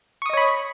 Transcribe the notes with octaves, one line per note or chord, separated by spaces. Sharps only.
C#5 D#5 B5 C#6 D#6